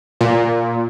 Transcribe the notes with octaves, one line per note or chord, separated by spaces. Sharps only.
A#2